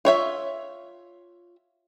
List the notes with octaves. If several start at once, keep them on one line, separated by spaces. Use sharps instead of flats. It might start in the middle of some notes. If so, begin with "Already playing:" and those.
F4 C#5 E5